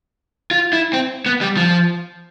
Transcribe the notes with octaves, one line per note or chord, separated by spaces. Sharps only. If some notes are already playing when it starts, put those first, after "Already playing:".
F4
E4
C4
B3
G3
F3